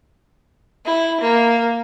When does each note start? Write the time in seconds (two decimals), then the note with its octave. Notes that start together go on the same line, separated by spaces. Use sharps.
0.85 E4
1.20 A#3